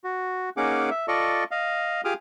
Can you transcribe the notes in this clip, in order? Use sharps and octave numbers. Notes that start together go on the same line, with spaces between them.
F#4
A#3 C#4 D#4 G#4 F#5 D6
E5
F4 A4 D5 D#5 C#6
D#5 F5
F4 G4 G#4 D6 D#6 F6